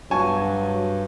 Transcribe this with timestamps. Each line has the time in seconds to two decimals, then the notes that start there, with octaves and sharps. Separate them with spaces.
0.11 G2 F#3 G#5 A5 C#6